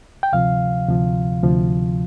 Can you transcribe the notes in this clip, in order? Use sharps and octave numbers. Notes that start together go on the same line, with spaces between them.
G5
D2 C3 F3 F5
D2 C3 F3
D2 C3 F3